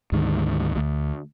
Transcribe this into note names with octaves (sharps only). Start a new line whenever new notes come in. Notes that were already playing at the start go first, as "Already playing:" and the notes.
D2 G#2 D#3
D2